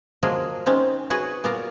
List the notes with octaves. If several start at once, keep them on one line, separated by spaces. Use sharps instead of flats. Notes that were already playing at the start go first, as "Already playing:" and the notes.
F3 F#3 G#3 A#3 G#4 A#4
G#3 C4 C#4 D#4
F#4 G#4 B4 C#5 F#5 G#5
A#2 B3 D5 F5 A#5